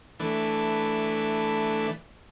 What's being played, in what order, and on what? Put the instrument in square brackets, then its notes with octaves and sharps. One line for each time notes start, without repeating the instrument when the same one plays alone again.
[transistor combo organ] E3 A3 D4 B4